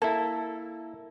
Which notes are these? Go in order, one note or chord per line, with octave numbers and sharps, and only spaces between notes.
A#3 E4 A4 A#4 E5